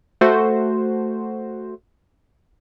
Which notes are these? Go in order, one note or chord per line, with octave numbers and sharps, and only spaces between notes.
A3 F#4 C5